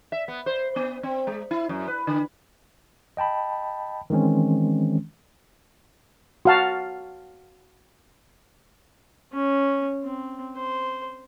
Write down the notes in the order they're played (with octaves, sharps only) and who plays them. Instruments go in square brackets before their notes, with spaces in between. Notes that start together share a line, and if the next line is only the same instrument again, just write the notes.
[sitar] E5
B3
C5
B3
C4
G#3
E4
F#2
B4
D3
[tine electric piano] D#5 G5 A5 B5
D#3 E3 G#3 C4 C#4
[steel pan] F#4 F5 A5
[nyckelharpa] C#4
C4
C5